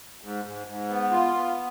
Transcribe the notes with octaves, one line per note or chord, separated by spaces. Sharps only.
G#2
G#2
G#2
B3
F4
B3